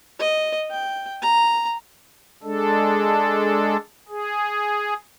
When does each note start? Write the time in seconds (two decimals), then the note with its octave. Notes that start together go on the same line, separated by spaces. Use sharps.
0.19 D#5
0.71 G5
1.22 A#5
2.43 G#3 D4 A4
4.09 G#4